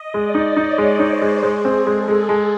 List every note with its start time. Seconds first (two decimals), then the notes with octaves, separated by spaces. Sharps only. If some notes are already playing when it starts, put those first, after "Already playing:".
Already playing: D#5
0.14 G#3 D5
0.35 D#4
0.56 D#4 C#5
0.78 G#3
0.99 D#4 C5
1.21 G#3
1.42 G#3 G#4
1.65 C4
1.86 G#3 A4
2.08 G#3
2.29 G#3